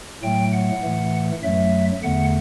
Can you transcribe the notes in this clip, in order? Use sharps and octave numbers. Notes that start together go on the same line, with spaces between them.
A2 F#3 A3 G5
F#5
A2 E3 A3
F#2 F#3 A3 E5
E2 D3 A3 F#5